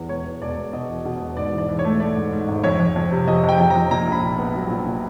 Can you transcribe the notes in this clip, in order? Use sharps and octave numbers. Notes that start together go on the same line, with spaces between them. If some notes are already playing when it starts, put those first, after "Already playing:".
Already playing: E2
E1 C#5
E2
E1 D5
E1
B2 D#5
E2
B2
E1
G#2 D5
E3
D5
E3
C#5
A3
A3 D5
G#2
G#2
G#1
F2 C#5
F2
F2
C3
F2 D#5
F2 G5
F2
A#5
F2
A#2 A#5
A#1
B5
A#2
B3
F#3
A#2
A#2